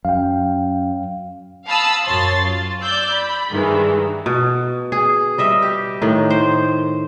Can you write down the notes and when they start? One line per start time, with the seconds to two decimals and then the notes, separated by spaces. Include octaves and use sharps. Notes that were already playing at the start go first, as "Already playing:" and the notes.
0.05 F#2 F5 G5
1.67 F5 A5 B5 D#6 E6
2.05 F#2 C#5 C6 A6
2.42 F4
2.81 D5 E6 G6
3.11 B5
3.50 G2 D#3 E3 G#3
4.26 B2
4.92 G#4
5.38 G3 D#5 E5
5.62 G4
6.02 A2 D#3
6.30 C5